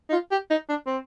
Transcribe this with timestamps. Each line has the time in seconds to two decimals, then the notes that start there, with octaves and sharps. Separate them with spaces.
0.09 D#4
0.12 F4
0.31 G4
0.50 D#4
0.69 D4
0.86 C4